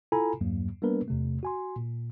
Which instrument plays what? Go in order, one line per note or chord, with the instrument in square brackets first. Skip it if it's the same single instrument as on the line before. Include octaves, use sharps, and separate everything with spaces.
[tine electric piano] E4 F4 A4 G#5 A#5 B5
E2 G2 F#3 A#3
G3 A#3 B3 D4 A#4 B4
E2 C3 A3
F#4 G#5 C6
A#2